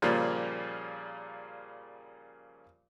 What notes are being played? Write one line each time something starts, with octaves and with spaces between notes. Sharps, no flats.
A#2 C#3 F3 G3 A#3